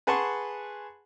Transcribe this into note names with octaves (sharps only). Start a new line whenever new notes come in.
G#4 B4 F#5 A5 C6 C#6